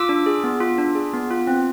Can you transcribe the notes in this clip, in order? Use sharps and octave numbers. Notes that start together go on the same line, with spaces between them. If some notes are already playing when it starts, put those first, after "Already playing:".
Already playing: F4 D6 E6
D4
G#4
B3
F4
D4
G#4
B3
F4
C4